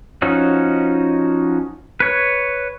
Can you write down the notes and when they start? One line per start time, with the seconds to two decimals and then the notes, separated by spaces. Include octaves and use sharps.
0.22 F3 C#4 D#4 F#4
2.00 B4 C#5